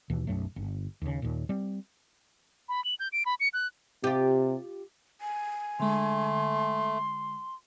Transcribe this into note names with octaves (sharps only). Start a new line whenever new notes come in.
D#2 B2 E3
B1 F#2 F#3 A3
G1
D#2 C#3
D#2 A#2
G3 C4
B5
F#7
G6
D7
B5
C#7
F#6
C3 F4 G4
G#5
D3 G#3 A3 C6